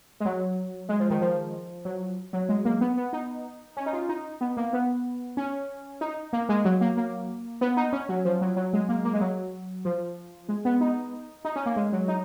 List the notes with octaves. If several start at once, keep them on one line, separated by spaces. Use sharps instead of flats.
G#3
F#3
G#3
F3
D#3
F3
F#3
F#3
G#3
A#3
B3
B3
D#4
C#4
D#4
F4
D#4
B3
A#3
B3
C#4
D#4
A#3
G#3
F#3
A#3
A#3
B3
D#4
C#4
F#3
F3
F#3
F#3
G#3
A#3
A#3
G#3
F#3
F3
G#3
B3
D#4
D#4
C#4
A#3
G#3
F#3
D#4